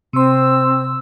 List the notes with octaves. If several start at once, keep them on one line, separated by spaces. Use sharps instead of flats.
C3 C4 C6 E6